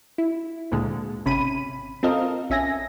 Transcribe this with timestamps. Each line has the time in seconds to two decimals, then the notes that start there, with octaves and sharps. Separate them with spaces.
0.18 E4
0.71 D2 A#2 D3 G#3
1.26 G#1 C3 C#4 B5 D#7
2.03 C4 F4 A4 A#4 D#5 F5
2.50 A#1 C#4 E5 G#5 A#6